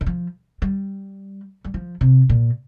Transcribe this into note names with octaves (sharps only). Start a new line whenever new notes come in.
D3
F3
G3
G3
F3
C3
A#2